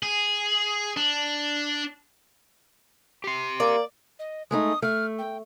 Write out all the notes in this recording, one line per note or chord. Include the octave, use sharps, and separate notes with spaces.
G#4
D4
G4 C6
A#3 D5
D#5
G#3 A3 D#4 D#6
A3 F6
G5